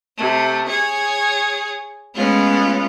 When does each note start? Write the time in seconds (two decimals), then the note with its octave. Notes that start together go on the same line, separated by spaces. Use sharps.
0.17 C3 A3
0.69 G#4 C#5
2.15 G#3 A3 B3 C#4 F4